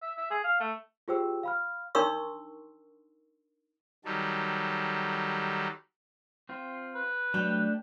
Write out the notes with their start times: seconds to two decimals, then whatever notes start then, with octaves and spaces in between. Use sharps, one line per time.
0.02 E5
0.18 E5
0.31 G#4
0.44 F5
0.60 A3
1.08 F4 G4 G#4 C5 G5 E6
1.43 F5 B5 F6
1.95 D4 D#4 A#4 C6 C#6 E6
4.05 D#3 F#3 G3 A4
6.49 C4 F4
6.95 B4
7.34 F#3 G3 A3 D4 F#4 G5